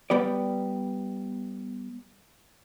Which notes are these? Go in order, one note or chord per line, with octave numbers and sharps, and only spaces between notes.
G3 B3 G4 D5